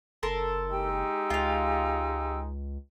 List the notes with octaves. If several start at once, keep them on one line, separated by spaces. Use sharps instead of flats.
F#1 A4 A#4 C6
G#3 D#4 G4 G5 E6
C#2 F4 F5